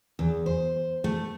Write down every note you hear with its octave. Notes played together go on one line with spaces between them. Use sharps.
E2
C5
A3